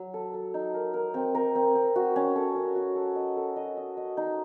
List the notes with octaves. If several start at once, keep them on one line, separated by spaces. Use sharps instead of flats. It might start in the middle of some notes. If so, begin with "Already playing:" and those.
Already playing: F#3
A4
A4
D#4
A#4
A#4
C4
A#4
C4
C4
F#4
C#4
A4
C#4
F#4
A4
D#5
A4
D#5
D#5
D#5
D#4